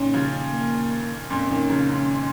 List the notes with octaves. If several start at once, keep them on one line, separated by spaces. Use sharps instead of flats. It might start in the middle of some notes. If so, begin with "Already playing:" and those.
Already playing: A#2 D#3 C#4
C#3 F3
A#3
F2 A#2 C#4
A#2 D#3
C#3 F3
G#2 C#3